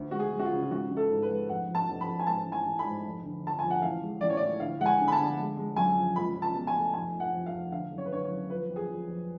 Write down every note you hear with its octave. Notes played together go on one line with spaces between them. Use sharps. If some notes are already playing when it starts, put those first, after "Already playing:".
Already playing: D2
G#3 F#4
G#4
G#3
F#4
F4
C#3
F4
G#1 F#4
G#1
A4
G#2
B4
G#3
F1 F#5
F2
A5
F1
B5
F1
G#5
G#2 A5
A1
G#5
A1
B5
G#2
F1
D3
D3 A5
F2 G#5
F#5
A1 F5
G#3
A1 D5
C#5
D5
A2
D3 F5
G#3 F#5
G#5
D3
B5
A5
D3
G#3
G#3
F#2 G#5
F3
C#2 B5
C#2
A5
B2
G#5
A3
F1 G#5
F3
F#5
F2
F5
F1
D3 F5
F#1
C#5
B4
D3 C#5
C#5
F#1
F3 B4
F2
G#4
F2
F2